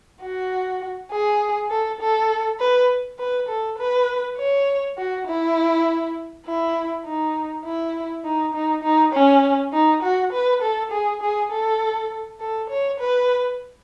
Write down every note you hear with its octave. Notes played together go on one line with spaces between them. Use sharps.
F#4
G#4
A4
A4
B4
B4
A4
B4
C#5
F#4
E4
E4
D#4
E4
D#4
D#4
D#4
C#4
D#4
F#4
B4
A4
G#4
G#4
A4
A4
C#5
B4